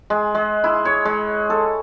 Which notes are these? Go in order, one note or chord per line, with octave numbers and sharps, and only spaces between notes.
G#3
G#3
E4
C#5
G#3
A4